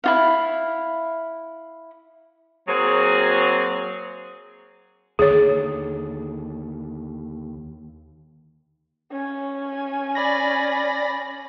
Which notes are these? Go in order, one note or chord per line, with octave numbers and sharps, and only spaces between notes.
E4 F4 F5
F#3 A#3 C4 F#4 G#4
D#2 D3 G#4 C#5
C#4 G#5
D5 B5 A#6